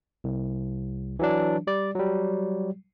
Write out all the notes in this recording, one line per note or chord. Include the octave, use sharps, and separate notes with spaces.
C2
E3 F#3 D4
G3 D5
F#3 G3